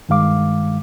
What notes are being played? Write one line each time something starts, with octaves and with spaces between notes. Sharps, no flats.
G2 D#3 G#3 F5 D6